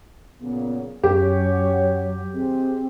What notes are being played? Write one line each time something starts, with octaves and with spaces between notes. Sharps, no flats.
A#2 C#3 F#3 B3
F#2 F#3 C#4 G4 C#5
D#3 C4 G#4